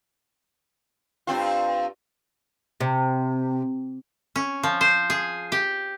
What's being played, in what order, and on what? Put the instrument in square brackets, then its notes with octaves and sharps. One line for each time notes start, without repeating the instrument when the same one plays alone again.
[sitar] G2 C4 F4
[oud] C3
[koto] C#4
F3
C5
G#4
G4